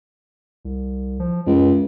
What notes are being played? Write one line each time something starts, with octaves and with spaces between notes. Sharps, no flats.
C2
F3
C#2 F#2